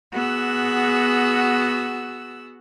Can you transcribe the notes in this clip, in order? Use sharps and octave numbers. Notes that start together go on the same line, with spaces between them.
B3 F#4 G#4 F#5 E6